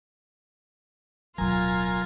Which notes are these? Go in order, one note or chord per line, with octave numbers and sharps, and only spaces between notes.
D1 B1 F#3 F4 A#4 G#5